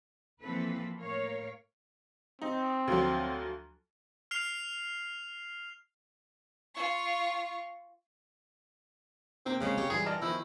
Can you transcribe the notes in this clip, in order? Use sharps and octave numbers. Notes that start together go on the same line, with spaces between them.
E3 F3 A#3 C4 A4 B4
A2 A#4 C#5 F5
C4 D#4
D2 F3 F#3
F6 C7 F7
F4 C#6
C3 A#3 C4
C#3 G#3 C4 C#4
G4 C#5
G#2 E3 G3 F4 G#4
A#4 D5 D#5 A5
B2 D#3 F3 E4 D#5